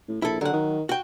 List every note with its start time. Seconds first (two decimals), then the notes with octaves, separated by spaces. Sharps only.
0.08 A2
0.22 A#1 E4 A4
0.41 D3 F#3 F#5
0.53 D#3
0.89 F#4 G5